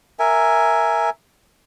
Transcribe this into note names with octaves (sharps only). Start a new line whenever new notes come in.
A#4 E5 G#5